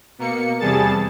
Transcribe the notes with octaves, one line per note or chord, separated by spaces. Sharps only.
B2 A#3 C#7
E2 C3 G3 G#4 A5 A6